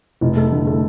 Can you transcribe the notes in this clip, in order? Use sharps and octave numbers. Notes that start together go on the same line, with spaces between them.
F1
A3
D3
A3